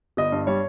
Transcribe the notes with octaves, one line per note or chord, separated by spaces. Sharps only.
G1 D#5
G2
G3 C#5